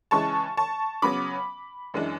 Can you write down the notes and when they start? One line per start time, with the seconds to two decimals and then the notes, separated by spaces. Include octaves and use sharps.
0.11 C#3 E3 G#3 A5 C#6
0.57 A5 C#6
1.02 C#3 F#3 B3 B5 D6
1.94 F#2 E3 G#3 D4